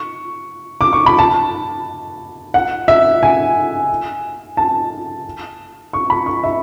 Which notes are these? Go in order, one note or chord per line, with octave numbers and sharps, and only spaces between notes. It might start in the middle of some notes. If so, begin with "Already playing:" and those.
Already playing: C#6
D6
C#6
B5
A5
F#5
E5
G#5
A5
C#6
B5
C#6
E5